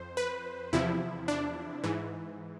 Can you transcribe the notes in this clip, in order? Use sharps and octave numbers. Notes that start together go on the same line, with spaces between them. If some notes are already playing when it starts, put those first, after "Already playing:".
Already playing: F2 C5
B4
E2 C3 F3 E4
D4
G#2 E3